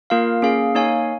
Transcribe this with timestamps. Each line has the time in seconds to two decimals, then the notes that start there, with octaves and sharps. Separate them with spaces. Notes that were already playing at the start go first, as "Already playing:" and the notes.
0.10 A#3 F4 A#4 F5
0.42 A#3 C#4 G#4 F5
0.75 A#3 D#4 C#5 F5 G#5